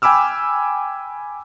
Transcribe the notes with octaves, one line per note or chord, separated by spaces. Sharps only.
G5 G#5 B5 D6 E6 F6